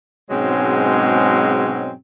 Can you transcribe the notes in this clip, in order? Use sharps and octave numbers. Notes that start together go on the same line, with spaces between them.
G#2 B2 F#3 G#3 C4 C#4